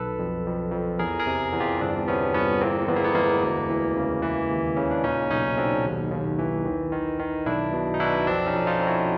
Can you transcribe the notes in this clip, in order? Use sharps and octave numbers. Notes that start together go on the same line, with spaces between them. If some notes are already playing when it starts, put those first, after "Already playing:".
Already playing: B1 A4 B4
F2
F2
F2
E2 G#4 A#4
G#4 A#4
C3
E2
F4 G4
G1 C4 D4
C3 B3 C#4
G1 B3 C#4
E2 A#3 C4
E2 B3
A#3
A3 B3
E2 G#3 A#3
D2
E3
C#3
E3
D#2
C#3 C#4
D4
A#2 C#4 D#4
B1 C#4 D#4
B1 C4 D4
D#2
D#2
E3
D#3
D#3
D#3
B1 D4 E4
B2
D#4
B2 D4 E4
F2 C4 D4
C#4 D#4
F2
D#4 F4
F2
E4 F#4